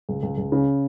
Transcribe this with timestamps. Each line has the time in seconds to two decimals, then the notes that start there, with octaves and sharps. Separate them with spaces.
0.09 C#2
0.23 C#2
0.38 C#2
0.52 C#3